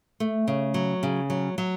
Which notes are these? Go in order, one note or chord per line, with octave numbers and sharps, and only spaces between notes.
A3
C#3
F#3
C#3
F#3
F#3